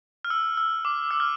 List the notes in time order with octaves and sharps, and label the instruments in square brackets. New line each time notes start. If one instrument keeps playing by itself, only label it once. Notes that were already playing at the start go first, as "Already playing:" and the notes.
[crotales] F6
E6
E6
D6
E6
F6